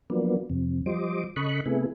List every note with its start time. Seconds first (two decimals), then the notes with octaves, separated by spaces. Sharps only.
0.10 F3 F#3 A#3 B3 D4
0.50 F2 C3
0.86 F3 G3 C5 D#5 D6
1.36 C#3 A4 D#5 B5 C#6 F#6
1.66 C3 A3 B3 E4 G#4